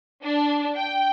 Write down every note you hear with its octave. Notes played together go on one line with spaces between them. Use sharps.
D4
G5